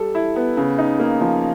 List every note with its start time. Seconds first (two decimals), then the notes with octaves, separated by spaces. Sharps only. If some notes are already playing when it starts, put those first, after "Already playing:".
Already playing: G3 A4
0.15 E4
0.36 B3
0.57 C#3
0.78 D#4
1.00 A#3
1.21 F3